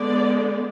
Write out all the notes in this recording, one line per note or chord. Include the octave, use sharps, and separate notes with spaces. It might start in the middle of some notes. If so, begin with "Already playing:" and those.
Already playing: D3 G#3 B3 D5